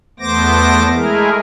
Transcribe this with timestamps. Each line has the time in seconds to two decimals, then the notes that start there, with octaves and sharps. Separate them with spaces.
0.20 E2 A3 B3 C5 D6 A#6
0.94 G#3 A3 E4 G#4 A#4